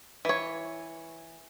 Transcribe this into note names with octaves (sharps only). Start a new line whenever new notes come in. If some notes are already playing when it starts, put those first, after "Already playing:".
E3 C#5